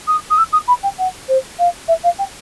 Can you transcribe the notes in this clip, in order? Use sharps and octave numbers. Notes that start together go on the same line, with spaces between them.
D#6
D#6
E6
D#6
B5
G5
F#5
C5
F5
E5
F5
G5